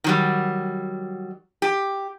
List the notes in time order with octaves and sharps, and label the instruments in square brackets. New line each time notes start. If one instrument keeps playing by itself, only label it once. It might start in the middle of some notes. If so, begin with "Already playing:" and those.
[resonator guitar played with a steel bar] D#3 F#3 G3
G4